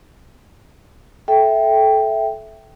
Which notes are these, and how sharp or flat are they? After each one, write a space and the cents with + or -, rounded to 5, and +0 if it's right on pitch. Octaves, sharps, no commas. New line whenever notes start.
A4 -20 E5 +0 G5 +0